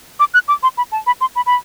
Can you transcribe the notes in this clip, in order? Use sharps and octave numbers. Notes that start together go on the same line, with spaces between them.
D6
F#6
D6
C6
B5
A5
B5
C6
B5
B5